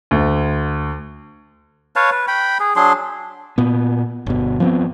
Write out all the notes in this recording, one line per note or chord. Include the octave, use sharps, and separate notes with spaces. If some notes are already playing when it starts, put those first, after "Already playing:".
D2
B4 C#5 F5 A5
B4
G5 B5
G#4
F#3 D4 G#4 C6
A#2 B3
G1 B2
F3 B3 C4